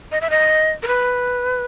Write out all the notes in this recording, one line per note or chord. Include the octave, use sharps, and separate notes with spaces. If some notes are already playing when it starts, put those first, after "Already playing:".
D#5
E5
D#5
A#4
B4